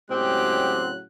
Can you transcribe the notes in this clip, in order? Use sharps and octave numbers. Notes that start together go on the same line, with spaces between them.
A2 C#3 F#3 G#3 C4 G4 F#6